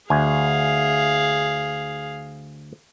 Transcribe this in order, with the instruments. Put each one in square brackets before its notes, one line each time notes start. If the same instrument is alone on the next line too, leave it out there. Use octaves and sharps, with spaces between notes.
[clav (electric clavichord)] D2 G#5 [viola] G#4 F5